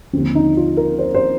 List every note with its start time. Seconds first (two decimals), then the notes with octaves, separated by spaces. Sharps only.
0.13 D#2 D3 F3 C4
0.35 D#4
0.57 F4
0.77 A#4
0.99 C5
1.14 C5